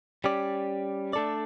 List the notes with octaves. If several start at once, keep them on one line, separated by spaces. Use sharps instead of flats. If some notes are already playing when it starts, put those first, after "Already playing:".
G3 C#4 G4 D5
A3 D4 A4 D5